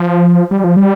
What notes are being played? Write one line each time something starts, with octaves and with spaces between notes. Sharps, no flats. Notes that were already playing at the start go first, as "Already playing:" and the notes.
Already playing: F3
G3
F3
G3